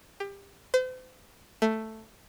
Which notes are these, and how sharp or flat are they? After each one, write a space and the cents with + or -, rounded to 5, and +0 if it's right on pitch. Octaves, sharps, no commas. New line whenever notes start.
G4 +25
C5 -40
A3 +5